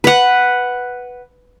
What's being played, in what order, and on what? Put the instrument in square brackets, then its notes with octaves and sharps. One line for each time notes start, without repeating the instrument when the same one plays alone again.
[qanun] B4 F#5